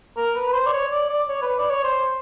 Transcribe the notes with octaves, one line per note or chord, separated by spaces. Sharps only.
A#4
B4
B4
C5
D5
C#5
D5
D5
C#5
B4
D5
C#5
C5